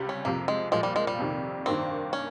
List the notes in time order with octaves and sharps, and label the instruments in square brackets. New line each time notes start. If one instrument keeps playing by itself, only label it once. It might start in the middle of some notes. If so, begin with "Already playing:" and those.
Already playing: [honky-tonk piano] C#2 C3 G3
[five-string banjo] C#4
[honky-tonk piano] F2 C3 F3 [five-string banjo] A#3
[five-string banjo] G#3
[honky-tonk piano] A#2 F3 A#3 [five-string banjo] G#3
[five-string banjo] G3
G#3
G3
[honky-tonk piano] F2 C3 D#3
[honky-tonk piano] G2 D#3 A#3 [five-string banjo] C4
[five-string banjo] C#4